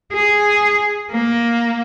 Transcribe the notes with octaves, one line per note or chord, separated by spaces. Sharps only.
G#4
A#3